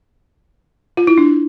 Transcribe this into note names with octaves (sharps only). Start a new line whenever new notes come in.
F4
E4
D4